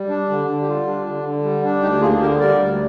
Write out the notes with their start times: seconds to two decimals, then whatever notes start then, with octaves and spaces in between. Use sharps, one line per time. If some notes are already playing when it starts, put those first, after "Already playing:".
Already playing: G3
0.09 D4
0.29 D3
0.47 D3
0.62 G4
0.67 G3 F4
0.87 D4
1.06 D3
1.24 D3
1.44 G3
1.63 D4
1.82 D2 D#4 G4
2.01 A#3 F4 G#4
2.21 D3 G4 A#4
2.40 G3 A#4 D5
2.60 D2